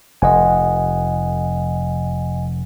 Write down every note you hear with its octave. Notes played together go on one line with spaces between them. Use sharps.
F1 D#5 F#5 G#5